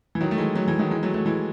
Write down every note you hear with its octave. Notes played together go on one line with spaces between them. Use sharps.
E3
D#3 F#3
A3
E3 G#3
F#3 A3
E3 G#3
D#3 F#3
E3 G#3
F#3 A3
F#3 A3
E3 G#3